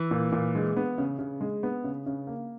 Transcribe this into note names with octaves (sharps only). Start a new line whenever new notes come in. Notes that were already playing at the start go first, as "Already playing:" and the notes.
Already playing: E3
A#2
A#2
G#3
B3
C#3
C#3
G#3
B3
C#3
C#3
A#3